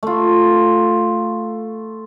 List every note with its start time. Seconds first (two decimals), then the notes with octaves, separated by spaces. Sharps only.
0.03 A3 F4